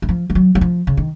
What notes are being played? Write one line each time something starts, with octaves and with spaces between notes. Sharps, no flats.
D#3
F3
F3
F#3
F#3
F3
C#3
D#3